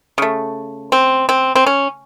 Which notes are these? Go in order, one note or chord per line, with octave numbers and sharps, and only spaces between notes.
C#3 A3
C4
C4
C4
C#4